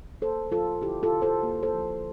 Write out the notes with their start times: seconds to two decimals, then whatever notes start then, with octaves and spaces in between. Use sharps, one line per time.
0.22 A#3 A4 C5
0.52 F3 F4 A4
0.82 D3 E4 G4
1.03 F4 A4
1.12 D3
1.22 A4 C5
1.43 A#3
1.63 A4 C5
1.73 F3